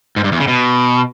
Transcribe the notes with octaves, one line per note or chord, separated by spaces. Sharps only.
G#2
G2
E2
C#3
B2